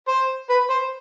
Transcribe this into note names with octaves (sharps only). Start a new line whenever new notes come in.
C5
B4
C5